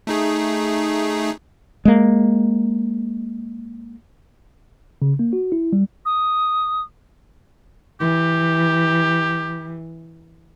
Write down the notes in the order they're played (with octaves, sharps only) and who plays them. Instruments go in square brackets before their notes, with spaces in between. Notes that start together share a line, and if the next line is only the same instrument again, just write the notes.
[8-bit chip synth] A3 D#4 G#4
[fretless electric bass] G#3 A#3
[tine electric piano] C#3
A#3
F#4
E4
G3
[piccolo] D#6
[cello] E3 [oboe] G4